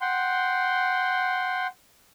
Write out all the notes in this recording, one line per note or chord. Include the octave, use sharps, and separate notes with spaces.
F#5 G5 C6